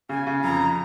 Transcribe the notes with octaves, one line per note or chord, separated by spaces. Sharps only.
C#3 G#5
C#3
F2 A#5